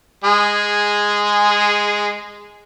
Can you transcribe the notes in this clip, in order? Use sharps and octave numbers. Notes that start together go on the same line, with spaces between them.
G#3 G#4